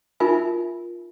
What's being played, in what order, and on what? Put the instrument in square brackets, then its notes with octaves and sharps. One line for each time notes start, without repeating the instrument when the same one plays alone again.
[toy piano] D#4 F4 A#4 E5 G#5